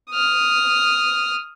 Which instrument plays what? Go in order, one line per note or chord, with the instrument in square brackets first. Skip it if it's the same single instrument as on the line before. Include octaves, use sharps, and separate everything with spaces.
[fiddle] D#6 F6